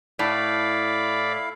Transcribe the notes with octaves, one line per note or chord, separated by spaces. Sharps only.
A2 E4 D5 F5 B5